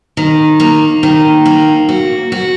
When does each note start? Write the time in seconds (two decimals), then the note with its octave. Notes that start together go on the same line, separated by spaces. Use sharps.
0.17 D#3
0.60 A#3
1.03 D#3
1.46 A#3
1.89 F#4
2.32 F#4